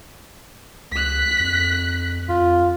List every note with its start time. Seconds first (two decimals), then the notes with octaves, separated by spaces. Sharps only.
0.92 C#2 F#6 B6
1.40 F2
2.29 F2 F4